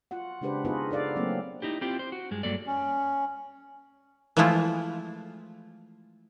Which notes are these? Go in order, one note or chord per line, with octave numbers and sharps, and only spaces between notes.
F4 F#4 F#5
C#3 G#3 D4 G4 B4 C5
B3 D#4 F4 F#4 G#4 B4
D#4 A4 D5 F5
F#3 A3 A#3 C4
D#4 E4 G4
C4 E4 F4 G4
C5
F#4
G2 G#3
G2 F#3 A#3 A4 D5
C#4
E3 F3 G#3 A3 E4 F4